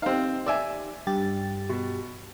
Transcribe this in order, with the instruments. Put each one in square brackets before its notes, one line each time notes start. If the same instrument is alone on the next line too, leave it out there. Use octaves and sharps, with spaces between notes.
[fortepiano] C4 F5 [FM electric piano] D#4 G4
[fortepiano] D5 E5 G#5
[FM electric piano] G2 G4 A6
[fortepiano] B2